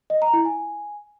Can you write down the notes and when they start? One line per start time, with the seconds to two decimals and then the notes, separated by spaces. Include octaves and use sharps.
0.10 D#5
0.22 A#5
0.33 E4
0.45 G#5